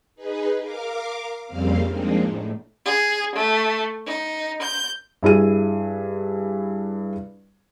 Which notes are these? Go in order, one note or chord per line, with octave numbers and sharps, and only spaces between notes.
D#4 G#4 B4
A#4 F5 D6
F2 C#3 G3 A#3 C4 F5
F3 G#3 A#3 C4 D4 D#4
A2
G#4
A3
D#4
G6
G2 E4 G#4 D#7